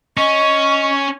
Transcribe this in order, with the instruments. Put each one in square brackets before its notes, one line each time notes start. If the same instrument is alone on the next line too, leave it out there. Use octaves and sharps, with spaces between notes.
[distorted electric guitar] C#4 [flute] D#5 [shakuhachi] C#6